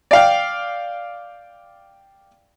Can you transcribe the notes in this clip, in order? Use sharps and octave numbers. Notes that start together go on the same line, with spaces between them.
D5 F5 G5